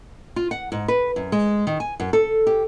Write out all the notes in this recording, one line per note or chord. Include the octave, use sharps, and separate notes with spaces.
F4
F#5
G#2
B4
F#2
G#3
D#3
G#5
F#2
A4
G4